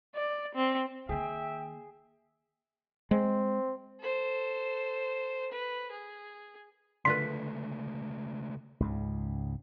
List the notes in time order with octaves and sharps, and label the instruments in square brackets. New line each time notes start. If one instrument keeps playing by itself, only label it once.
[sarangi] D5
C4
[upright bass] D#3 A#3 [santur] G#4 [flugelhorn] E5 [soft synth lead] G5
[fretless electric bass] G#3 [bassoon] C4
[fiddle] A4 C5
B4
G#4
[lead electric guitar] C#2 A3 [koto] D3 F4 B4 [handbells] C6 [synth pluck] B6
[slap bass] C#2 G#2 C#3